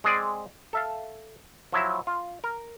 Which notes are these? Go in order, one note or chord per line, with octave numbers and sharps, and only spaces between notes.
G#3 C4 G#4 D5
A4 E5 F5
F3 F#3 E4 E5
F4
A#4